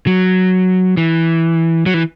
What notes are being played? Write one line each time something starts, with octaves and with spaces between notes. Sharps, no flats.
F#3
E3
F#3
E3